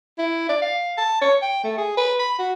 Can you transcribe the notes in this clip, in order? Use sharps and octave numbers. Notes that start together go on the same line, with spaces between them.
E4
D5
F5
A5
C#5
G5
A3
G#4
B4
B5
F#4